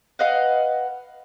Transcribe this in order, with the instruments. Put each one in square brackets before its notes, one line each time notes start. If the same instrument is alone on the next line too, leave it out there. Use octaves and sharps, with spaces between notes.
[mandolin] B4 D#5 F5 F#5